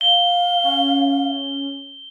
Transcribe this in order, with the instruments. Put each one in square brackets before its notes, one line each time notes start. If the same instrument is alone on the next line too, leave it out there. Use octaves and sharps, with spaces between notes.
[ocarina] F5 [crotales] G7
[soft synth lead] C#4